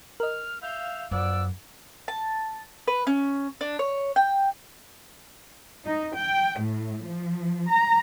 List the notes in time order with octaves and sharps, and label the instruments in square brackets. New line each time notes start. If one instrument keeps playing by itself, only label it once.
[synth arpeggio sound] A#4 D#5 [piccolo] F6
[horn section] E5 F5 [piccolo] G6
[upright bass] F#2 [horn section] F3 B3 D5 [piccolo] E6
[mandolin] A5
B4
C#4
D4
C#5
G5
[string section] D#4
G5
A2
F3
A#5